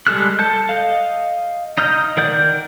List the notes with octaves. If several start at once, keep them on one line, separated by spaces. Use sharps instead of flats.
G3 G#3 A4 F6 F#6
A4 A5 G6
D#5 F5
D#4 D#5 F6 G6
D#3 A#4 D5 F#5 G6